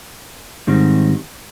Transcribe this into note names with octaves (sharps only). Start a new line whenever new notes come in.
G#2 D#3 G3 C4